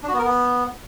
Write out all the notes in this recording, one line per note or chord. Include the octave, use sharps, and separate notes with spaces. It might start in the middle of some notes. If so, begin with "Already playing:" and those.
D4
F#4
B3
A#4
B3